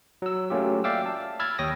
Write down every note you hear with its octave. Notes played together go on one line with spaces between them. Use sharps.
F#3 E6
F#3 A3 A#3 C#4 F4 G4
D5 E5 F5 G5 D6 E6
A5
B5 E6 F6 G#6 A6
D#2 C#5 G5 D#6 A#6